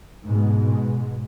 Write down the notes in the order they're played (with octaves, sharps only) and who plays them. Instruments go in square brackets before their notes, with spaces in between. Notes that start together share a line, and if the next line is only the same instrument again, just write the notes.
[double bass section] G#2 B2 G#3